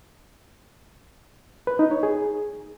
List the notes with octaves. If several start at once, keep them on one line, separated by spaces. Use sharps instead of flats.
B4
D#4
C#5
G#4